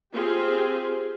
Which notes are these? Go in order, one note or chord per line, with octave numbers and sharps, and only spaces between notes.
C4 F4 G4 G#4